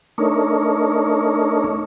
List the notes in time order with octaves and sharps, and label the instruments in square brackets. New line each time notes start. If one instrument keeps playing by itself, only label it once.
[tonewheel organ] A3 D4 D#4 A#4 C#5